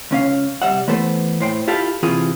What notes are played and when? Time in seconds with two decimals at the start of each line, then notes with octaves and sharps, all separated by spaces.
0.11 C#2 C#4 F5
0.62 C3 G3 E5 F#5
0.88 E3 A3 B3 A4 C5
1.40 A2 C5 G5
1.67 E4 F4 G4 A4 E5 F5
2.03 C3 E3 C4 F4 G#4